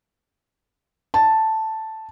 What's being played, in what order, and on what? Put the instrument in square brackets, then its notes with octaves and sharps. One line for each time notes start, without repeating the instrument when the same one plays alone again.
[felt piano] A5